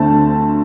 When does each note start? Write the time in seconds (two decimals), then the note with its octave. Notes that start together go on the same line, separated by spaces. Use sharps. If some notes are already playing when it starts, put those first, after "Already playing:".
Already playing: D2 D3 A3 C4 A5